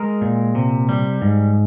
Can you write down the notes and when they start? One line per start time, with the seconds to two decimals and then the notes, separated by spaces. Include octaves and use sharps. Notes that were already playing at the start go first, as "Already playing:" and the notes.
Already playing: G#3 A#4
0.21 A#2
0.55 C3
0.89 G3
1.22 G#2